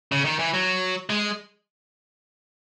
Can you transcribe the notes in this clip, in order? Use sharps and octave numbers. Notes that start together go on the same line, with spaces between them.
C#3
D#3
E3
F#3
G#3